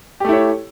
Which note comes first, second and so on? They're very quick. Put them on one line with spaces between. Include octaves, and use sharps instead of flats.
G4 A3 E4 C#5